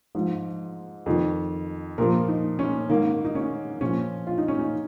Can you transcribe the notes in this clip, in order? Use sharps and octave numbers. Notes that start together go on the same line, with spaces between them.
G#2 F3
F2 D#3
A#2 F3 A#4
D#4
C#4
G#2 D#3 A#3
D#4
C#4
A#2 F3 C#4
F4
D#4
C#4
D#4